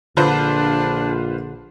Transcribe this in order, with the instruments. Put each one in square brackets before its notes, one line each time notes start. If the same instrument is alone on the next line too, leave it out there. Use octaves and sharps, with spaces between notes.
[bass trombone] A#1 [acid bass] D3 [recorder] D4 [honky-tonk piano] F4 B4 C5